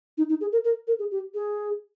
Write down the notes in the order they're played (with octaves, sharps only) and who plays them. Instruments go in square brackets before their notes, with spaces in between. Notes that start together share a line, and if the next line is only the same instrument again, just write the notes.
[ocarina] D#4
D#4
G#4
A#4
A#4
A#4
G#4
G4
G#4